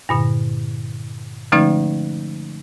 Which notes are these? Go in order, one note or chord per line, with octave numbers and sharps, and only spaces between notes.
G2 A#2 D3
D3 F3 G#3 A3 C#4 D#4